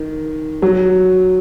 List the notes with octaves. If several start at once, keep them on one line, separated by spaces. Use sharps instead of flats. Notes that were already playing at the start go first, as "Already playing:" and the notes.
Already playing: D#3
F#3